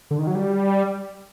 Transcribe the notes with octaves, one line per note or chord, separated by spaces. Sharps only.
D3
D#3
F#3
G3